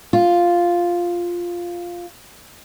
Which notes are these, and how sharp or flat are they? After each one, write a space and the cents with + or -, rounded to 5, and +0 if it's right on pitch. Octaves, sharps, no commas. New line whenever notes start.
F4 +0